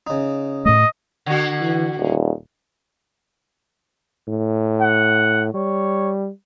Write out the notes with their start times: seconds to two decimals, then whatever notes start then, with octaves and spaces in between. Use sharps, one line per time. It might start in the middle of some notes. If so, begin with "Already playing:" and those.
0.07 C#3 D#4
0.66 A2 A3 D#5
1.26 D3 F#4
1.61 E3
1.98 D#1
4.29 A2
4.82 F#5
5.54 G3 C#5